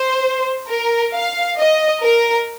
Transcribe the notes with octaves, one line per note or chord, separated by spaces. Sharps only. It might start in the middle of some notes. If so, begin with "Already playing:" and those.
Already playing: C5
A#4
F5
D#5
A#4